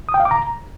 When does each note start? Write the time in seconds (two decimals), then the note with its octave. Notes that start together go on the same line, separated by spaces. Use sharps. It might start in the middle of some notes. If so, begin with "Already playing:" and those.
0.09 D#6
0.14 G5
0.20 F5
0.25 D6
0.31 A#5